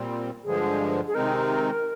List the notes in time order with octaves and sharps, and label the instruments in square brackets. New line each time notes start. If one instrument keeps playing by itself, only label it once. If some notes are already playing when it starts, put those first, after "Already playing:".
Already playing: [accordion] A#2 G3 C4
[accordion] G2 D3 F3 G#3 [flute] G#4
[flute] G#4
[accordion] C3 D#3 G#3 C4 D#4 [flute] A#4